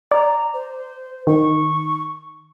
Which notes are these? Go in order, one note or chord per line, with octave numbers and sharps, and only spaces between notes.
D5 A#5
C5
D#3 C#6